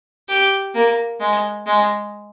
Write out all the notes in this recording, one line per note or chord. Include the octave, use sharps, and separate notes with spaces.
G4
A#3
G#3
G#3